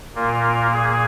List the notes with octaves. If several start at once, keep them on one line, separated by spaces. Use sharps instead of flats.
A#2 A#3 F4 A#4
G#4